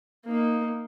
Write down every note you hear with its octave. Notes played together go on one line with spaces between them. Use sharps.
A#3 D#4